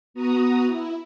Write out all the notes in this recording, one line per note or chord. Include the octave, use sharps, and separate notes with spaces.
B3 F#4 A#5 D#6
E4